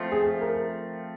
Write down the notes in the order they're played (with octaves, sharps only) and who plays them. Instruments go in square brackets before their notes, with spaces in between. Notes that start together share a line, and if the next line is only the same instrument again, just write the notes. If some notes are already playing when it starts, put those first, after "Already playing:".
Already playing: [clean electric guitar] F3 A3 C4 F4
[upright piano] G#4
A#4